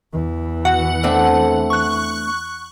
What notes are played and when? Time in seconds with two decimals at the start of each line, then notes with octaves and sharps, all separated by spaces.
0.13 E2 E3
0.65 F#4 F#5
1.03 A3 C4 D4
1.70 C#6 F#6